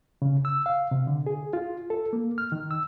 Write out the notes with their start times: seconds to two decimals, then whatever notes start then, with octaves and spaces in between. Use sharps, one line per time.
0.22 C#3
0.45 E6
0.66 F5
0.91 C3
1.07 D3
1.26 G#4
1.53 F4
1.90 A4
2.13 A#3
2.38 F6
2.52 D#3
2.71 E6